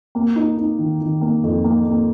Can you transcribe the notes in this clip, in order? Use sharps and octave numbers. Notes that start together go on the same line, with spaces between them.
A#3
D#4
D#4
D#3
D#3
A#3
F2
A#3
A#3